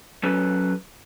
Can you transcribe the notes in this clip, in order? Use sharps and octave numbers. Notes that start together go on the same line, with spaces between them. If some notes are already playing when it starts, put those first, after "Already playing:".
F#3 C#4 A4 B4